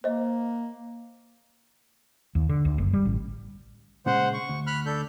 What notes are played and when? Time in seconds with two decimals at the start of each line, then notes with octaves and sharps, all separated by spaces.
0.04 A#3 C5 D#5
2.35 D#2
2.49 D3
2.65 D2
2.78 F#1
2.93 G3
3.05 A1
4.06 A#2 C#3 G#3 C5 F#5
4.33 C#6
4.49 D2
4.67 B5 F6 F#6
4.86 D4 A4 G6